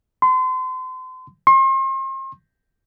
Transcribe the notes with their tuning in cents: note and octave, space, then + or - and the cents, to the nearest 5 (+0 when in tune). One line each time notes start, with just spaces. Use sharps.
C6 -35
C6 +40